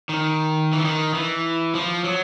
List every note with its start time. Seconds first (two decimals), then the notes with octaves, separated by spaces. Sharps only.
0.09 D#3
0.73 E3
0.85 D#3
1.14 E3
1.75 F3
2.04 F#3